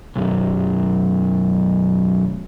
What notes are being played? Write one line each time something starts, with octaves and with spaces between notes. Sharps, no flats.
B1 F#2